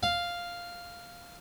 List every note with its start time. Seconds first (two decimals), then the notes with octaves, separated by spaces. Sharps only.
0.03 F5